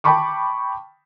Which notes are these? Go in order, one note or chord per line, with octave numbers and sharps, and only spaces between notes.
G5 A5 B5 C#6 D6